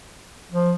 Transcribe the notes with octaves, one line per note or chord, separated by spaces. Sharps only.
F3